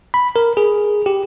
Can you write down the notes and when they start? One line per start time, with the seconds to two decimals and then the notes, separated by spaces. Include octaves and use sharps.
0.14 B5
0.36 A#4
0.57 G#4
1.06 G4